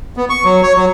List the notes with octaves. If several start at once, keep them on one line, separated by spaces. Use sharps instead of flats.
B3
C#6
F#3
C#5
F#3